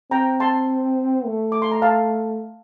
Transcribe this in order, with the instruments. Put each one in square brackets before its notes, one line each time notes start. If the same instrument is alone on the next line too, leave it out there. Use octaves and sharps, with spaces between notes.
[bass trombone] C4 [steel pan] G5 A#5
[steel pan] A5 C6
[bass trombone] A3
[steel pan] D6
C6
A#5
F5 A5